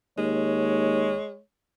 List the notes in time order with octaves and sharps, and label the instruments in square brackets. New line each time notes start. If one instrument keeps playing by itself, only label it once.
[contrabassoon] D#2 [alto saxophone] G#3 [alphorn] C#5